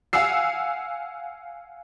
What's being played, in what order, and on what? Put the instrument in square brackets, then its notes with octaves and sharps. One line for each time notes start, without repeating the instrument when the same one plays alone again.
[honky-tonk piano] F5 F#5 G#5 E6 C7